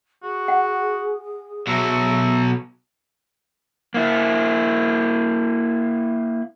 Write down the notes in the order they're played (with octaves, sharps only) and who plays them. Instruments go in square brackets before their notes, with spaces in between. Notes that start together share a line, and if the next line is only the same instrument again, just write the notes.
[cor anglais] F#4 [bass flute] G#4
[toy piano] F#5
[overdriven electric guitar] B2 F#3 [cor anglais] E5
[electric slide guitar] A#3 E4